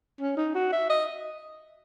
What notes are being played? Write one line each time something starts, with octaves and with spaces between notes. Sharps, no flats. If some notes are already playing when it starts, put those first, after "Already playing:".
C#4
D#4
F#4
E5
D#5